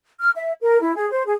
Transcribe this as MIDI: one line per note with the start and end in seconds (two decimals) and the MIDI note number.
0.20 0.30 89
0.35 0.52 76
0.62 0.79 70
0.81 0.94 64
0.96 1.09 68
1.11 1.23 72
1.26 1.34 68